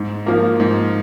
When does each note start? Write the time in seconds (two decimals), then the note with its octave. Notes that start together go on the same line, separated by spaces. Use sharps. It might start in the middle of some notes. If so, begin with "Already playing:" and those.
Already playing: G#2
0.26 F3 A#3
0.60 G#2